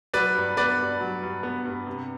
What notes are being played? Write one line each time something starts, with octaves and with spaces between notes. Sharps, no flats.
F#3 B4 D5
G2
B3 B4 D5
G2
F#3
G2
B3
G2
C3